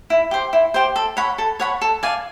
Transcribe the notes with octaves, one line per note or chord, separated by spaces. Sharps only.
E4
G4 C5
E4
G4 C5
A4
C#5 F#5 B5
A4
C#5 F#5 B5
A4
D5 F5 G#5